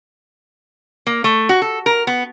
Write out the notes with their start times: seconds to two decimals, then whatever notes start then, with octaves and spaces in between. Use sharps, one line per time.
1.07 A#3
1.24 A3
1.49 F#4
1.62 A4
1.86 A#4
2.07 B3